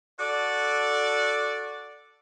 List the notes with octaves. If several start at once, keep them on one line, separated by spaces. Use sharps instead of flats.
F#4 A4 D5